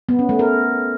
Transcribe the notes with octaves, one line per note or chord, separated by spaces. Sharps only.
B3
C#4
A3
A#4